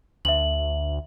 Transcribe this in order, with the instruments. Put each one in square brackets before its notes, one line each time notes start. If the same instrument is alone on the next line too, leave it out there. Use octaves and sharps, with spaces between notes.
[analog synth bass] D2 [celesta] E5 F#7